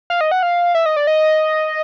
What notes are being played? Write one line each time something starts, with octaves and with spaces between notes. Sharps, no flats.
F5
D#5
F#5
F5
E5
D#5
D5
D#5